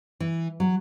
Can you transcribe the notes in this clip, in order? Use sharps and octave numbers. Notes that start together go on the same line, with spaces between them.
E3
F#3